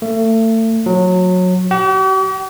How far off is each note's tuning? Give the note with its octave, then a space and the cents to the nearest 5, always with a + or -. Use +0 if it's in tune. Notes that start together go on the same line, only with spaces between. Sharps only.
A3 +30
F#3 -20
G4 -45